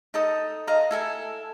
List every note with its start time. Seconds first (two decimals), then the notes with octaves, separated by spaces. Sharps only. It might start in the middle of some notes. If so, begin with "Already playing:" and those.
0.14 D#4 A4 D#6
0.67 D#5 F5 A#5
0.91 E4 A4 G#5